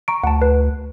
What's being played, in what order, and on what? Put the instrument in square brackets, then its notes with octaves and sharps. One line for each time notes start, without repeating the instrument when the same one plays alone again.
[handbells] A#5 C#6 D7
[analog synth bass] D2 [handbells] F#5 A5
[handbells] B4